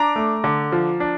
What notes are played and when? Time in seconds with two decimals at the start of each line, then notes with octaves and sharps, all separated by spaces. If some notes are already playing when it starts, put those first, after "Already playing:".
Already playing: D4 A#5 D6
0.16 A3
0.44 D3
0.72 F3
1.00 D4